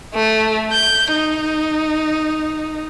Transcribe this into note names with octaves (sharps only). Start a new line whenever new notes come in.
A3
G6
D#4